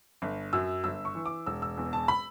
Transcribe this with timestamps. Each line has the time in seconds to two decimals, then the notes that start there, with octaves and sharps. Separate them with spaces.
0.22 G1
0.53 F#2 E6
0.84 G1 E6
1.05 C#6
1.15 E3
1.26 D6
1.46 E1 E6
1.62 E6
1.78 E2
1.93 A5
2.08 B5